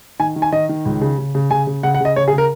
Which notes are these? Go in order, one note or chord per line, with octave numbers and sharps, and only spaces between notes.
D#3 G#5
D#3
G#5
D#3 D#5
D#3
C#2
C#3
C#3
C#3
C#3 G#5
C#3
C#3 F#5
F#5
C#3 D#5
C#3 C#5
G#4
C#3
A#4